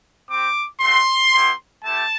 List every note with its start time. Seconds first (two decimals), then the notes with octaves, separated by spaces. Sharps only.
0.28 C4 G4 D6
0.81 A3 C4 F#4 C6
1.33 B3 E4 G4
1.84 A3 E4 G4 A5